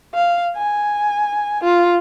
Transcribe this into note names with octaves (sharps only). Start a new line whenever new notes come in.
F5
G#5
F4